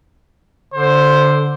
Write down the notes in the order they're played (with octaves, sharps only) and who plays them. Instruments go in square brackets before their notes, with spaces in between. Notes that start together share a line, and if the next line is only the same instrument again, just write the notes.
[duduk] D3 [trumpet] C5